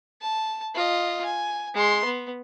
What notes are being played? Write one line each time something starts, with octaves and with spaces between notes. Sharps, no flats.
A5
F4 D#5
G#5
G#3 C6
B3